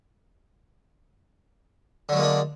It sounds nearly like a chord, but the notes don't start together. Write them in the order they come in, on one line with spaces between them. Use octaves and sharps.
D3 F#3 G#3 A#3 D4